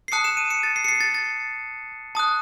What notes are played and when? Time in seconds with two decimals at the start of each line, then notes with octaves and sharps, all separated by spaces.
0.08 C7
0.12 A5 D#6 F#6 C#7
0.24 E7
0.37 D#7
0.51 C#7
0.63 A6
0.76 C7
0.84 C#7
0.88 C7
1.01 A6
1.14 A6
2.15 A5 D#6 F#6